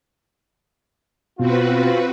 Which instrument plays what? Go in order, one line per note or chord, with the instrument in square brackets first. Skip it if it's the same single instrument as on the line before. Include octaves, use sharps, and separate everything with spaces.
[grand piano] B2 [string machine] C4 F#4 B4 [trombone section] F4